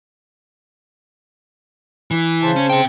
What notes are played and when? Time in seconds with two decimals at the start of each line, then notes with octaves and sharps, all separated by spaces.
2.11 E3
2.42 C#3 C5 A5
2.56 C#4
2.70 C3 G5